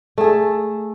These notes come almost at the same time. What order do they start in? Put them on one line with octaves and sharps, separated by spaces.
A3 G#4 A4